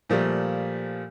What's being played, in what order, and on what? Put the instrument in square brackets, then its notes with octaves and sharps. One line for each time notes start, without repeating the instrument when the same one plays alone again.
[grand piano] A#2 F3 G3 A3